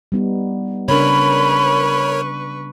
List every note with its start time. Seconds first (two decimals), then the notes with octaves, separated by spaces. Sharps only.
0.12 G3 B3 D#4
0.88 C#3 D4 A#4 B4 C#5 B5 C#6